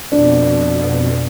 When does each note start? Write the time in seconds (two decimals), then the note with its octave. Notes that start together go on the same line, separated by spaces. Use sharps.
0.12 F2 B2 D4